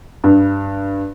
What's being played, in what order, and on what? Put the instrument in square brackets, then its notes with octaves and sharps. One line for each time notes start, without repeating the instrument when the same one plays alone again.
[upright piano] G2